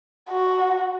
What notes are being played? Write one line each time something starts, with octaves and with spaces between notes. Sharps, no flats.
F#4